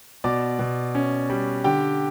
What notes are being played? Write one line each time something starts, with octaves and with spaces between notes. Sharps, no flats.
B2 D5 D6
B2
C#4
G3
D3 G4 G5